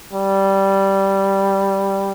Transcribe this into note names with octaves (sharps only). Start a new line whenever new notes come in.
G3